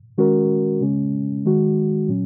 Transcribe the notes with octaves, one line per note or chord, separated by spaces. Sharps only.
D#3 G#3 C#4 F#4 A#4
C#3 G#3 C#4
D#3 G#3 F#4
A#2 F#3 C#4